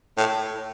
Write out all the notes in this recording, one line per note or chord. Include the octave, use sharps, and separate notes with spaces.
A2